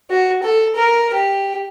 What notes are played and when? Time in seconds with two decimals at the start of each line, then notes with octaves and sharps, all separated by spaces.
0.10 F#4
0.43 A4
0.76 A#4
1.14 G4